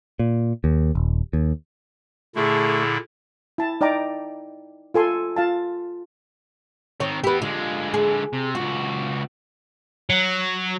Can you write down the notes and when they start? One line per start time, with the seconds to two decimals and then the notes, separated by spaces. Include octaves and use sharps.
0.19 A#2
0.64 D#2
0.95 D#1
1.33 D#2
2.36 A#2 D3 A3 E4 G#4
3.58 E4 A5
3.81 D#4 D5 G5 A#5 D6
4.94 F4 A4 G#5 C6
5.36 F4 F5 A5
7.00 D#3 C4 C#5
7.24 B3 E4 G4 B4
7.42 D3 G#3 F4
7.94 G#4
8.33 C3
8.55 C#2 F4 F#4
10.10 F#3